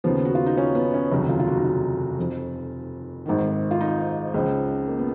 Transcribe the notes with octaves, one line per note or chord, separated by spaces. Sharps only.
D#2 C#3 F3 B3
F#4
F4
D#4
C#4
B3
C#4
F1 D#2 C#3 F#3 D#4
F4
F4
F#4
D#4
F4
F2 F3
G#1 G#2 D#3
F4
D#4
C#2 C#3 F3
A#3
B3